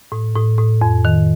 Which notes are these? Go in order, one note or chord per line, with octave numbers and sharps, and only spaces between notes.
A2
A2
A2
F2
D#3